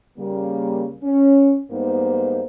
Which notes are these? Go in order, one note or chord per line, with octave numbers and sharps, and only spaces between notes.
C#3 G3 A#3
C#4
G#2 G3 A#3 B3 D#4 C5